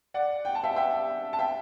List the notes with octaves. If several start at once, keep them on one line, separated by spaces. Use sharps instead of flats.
D5 F#5
G5
A5
E5 G5
E5 G5
A5
E5 G5